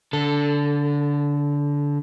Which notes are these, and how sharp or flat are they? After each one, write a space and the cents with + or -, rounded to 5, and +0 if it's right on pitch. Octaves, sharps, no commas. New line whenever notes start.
D3 -20 A4 +0